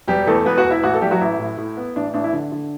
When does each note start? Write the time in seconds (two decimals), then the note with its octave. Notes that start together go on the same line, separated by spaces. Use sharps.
0.07 E1 G3 G4
0.27 E2 A3 A4
0.45 E1 B3 B4
0.58 F#4 F#5
0.64 E1
0.71 E4 E5
0.83 A1 F#4 F#5
0.94 A4
1.01 A1 G3 G4
1.11 F#3 F#4
1.21 A1 E4
1.39 A2
1.57 A2
1.77 B3
1.96 A1 D4
2.14 A1 D4
2.24 E4
2.33 D3
2.52 D3